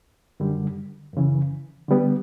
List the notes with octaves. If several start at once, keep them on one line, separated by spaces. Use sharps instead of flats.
F#2 D3 G3
F#2 C#3 E3
D3 G3 B3